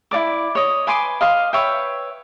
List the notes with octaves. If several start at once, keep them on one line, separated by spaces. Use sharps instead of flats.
E4 F#4 D5 D6
C#5 D#5
B4 G#5 C6 D6
D#5 F5 C6
B4 C#5 E5 G5